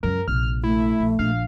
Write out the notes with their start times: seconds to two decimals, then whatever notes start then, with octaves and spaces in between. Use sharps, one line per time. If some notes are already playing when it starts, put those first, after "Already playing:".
0.03 C#2 F#2 A#4
0.28 A#1 C3 F6
0.64 A3 E4
1.00 A#1
1.19 A#1 D4 F5